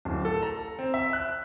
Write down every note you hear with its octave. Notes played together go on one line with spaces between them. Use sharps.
D1
A4
A#5
C4
E5
F#6